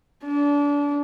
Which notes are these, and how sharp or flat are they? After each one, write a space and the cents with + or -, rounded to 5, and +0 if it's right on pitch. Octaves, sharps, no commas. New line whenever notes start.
D4 -30